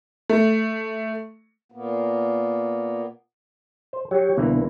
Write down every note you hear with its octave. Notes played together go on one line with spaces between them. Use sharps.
A3
A#2 A#3 B3
C5
F#3 G4 C#5
C2 B2 D3 E3 A#3 B3